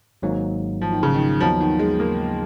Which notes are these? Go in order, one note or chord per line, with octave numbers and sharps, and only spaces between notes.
G#1 G#2 F#3 A#3
F3
D#3
C#3
D#3
D#2 C#3 F3 F#3 B3 D#4
D#3
G#3
A#3